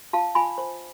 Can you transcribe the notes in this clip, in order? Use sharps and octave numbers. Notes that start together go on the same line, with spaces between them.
F4 F5 A5
F4 G#5 B5
C5